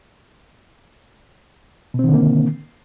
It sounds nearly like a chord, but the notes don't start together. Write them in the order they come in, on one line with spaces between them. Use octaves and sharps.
B2 C4 D#3 D3 A#3